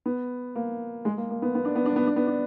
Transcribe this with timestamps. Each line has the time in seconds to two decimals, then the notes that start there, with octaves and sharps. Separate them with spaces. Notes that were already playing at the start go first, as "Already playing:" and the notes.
0.06 B3
0.55 A#3
1.05 G#3
1.18 A#3
1.30 A#3
1.42 B3
1.55 B3
1.65 D4
1.76 B3
1.86 D4
1.96 B3
2.07 D4
2.16 B3
2.27 D4